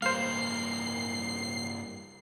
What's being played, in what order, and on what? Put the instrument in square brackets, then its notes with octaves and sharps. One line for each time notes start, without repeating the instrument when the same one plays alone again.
[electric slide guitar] G2 G3 A#3 [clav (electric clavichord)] C5 F5 [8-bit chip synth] C7